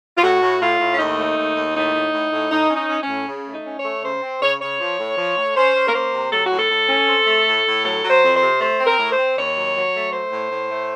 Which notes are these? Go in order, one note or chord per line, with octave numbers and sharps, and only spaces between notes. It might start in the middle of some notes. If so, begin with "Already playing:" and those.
F4
A2 F#4
A2
A2 F4
A2
C#4
D#2 D#4
A3
D#2
D#2
A2 D#4
A2
A2
A2
A2 D#4
C#4
D#4
C#4
C#4
A2
C#3
A3
D#4
C#4
C#5
A3
C#3 C5
C4
C#3 C#5
C#3 C#5
F3
A2
F3
A2
C#4 C5
C#4
A#4
A#3 C5
C3
F#3 A4
F#4
A2
A4
A2
C#4
C4
A3
A2
A2
F#3 A4
F#3
C5
F2
C5
C3
A3 C5
C4
A#4
A2
C5
C4
D#2 C#5
F#3
F#3
A3
A3 C5
A2
A2
A3